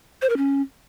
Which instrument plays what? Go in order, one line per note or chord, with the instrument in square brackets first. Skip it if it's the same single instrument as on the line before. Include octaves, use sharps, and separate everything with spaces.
[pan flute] C5
A#4
C#4